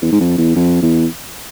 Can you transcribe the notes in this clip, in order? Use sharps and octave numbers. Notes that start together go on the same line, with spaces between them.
E2
G#2
F2
E2
F2
E2